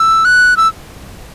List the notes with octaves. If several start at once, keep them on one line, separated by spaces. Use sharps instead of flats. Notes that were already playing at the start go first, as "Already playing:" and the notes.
Already playing: E6
F#6
E6